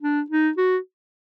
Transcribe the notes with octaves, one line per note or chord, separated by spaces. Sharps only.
D4
D#4
F#4